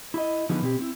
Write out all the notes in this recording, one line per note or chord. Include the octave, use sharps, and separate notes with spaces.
E4 D#5
D3 E3 F3 G#3 B3 D#4
B2 C4 G4
C4 E4